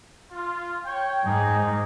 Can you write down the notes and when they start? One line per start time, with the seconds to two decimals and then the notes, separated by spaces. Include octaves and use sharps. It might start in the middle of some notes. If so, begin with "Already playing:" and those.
0.32 F4
0.86 C#5 G5
1.25 G#2 A#3 D#4 G#4